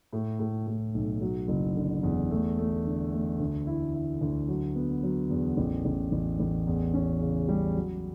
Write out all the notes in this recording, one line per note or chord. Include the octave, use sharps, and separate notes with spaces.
A2
A2
A2
B1
F#3
F#1
D3
E2
A3
A3
D3
A3
D2
E4
E4
D2
F#3
B3
F#3
E2
A1
A1
A1
A1
E2
C#4
C#3
G3
F#3